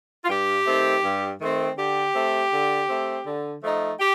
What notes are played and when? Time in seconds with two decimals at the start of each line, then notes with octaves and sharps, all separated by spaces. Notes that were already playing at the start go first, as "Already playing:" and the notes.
0.24 F4
0.29 G2 G4
0.66 D#3 A3 C4
1.04 G2
1.41 D#3 A3 C4
1.77 D3 G4
2.15 A3 C4
2.52 D3
2.89 A3 C4
3.26 D3
3.63 F3 A3 D#4
4.00 G4